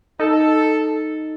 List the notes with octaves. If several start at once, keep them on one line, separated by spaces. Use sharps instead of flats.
D#4 A4